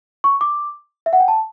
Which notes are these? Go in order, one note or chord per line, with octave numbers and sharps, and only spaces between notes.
C#6
D6
E5
F#5
G5
A5